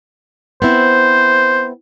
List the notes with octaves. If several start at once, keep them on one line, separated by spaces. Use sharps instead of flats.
B3 C4 E4 C5